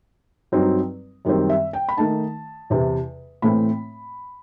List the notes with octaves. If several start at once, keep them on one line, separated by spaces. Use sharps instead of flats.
G2 F#3 C4 D#4
F#2 D#3 G3 C4
E5
G5
B5
D#3 A3 D#4 A5
E2 C3 E3
A2 E3 A3 C4 B5